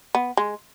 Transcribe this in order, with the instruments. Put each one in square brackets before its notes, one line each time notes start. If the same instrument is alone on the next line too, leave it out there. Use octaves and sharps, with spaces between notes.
[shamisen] B3
G#3